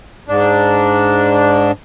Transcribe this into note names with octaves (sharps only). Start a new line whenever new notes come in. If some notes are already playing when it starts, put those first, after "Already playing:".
G#2 D4